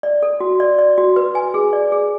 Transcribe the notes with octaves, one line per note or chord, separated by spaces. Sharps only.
D5
A4
F#4
D5
D5
F#4
B4
G#5
G#4
D5
G#4